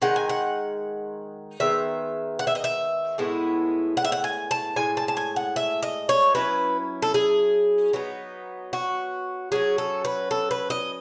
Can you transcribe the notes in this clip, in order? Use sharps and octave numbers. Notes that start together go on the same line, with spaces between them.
D#3 G#3 D#4 F#5
G#5
F#5
D#3 G#3 B3 E5
F#5
E5
D#5
E5
A2 G#3 B3 E4
F#5
E5
F#5
G#5
A5
A2 G#3 G#5
A5
A5
G#5
F#5
E5
D#5
C#5
F#3 C#4 E4 B4
A4
G#4
F#3 B3 D#4
F#4
F#3 A3 C#4 G#4
A4
B4
A4
B4
D#5